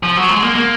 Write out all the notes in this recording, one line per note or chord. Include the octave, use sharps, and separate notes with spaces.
F3
F#3
G#3
A#3
A#3